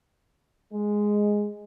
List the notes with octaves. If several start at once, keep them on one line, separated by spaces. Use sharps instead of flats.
G#3